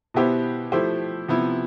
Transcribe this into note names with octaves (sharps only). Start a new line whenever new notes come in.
B2 B3 E4 G4 C5
F3 A3 E4 G4 C5
C3 F3 B3 E4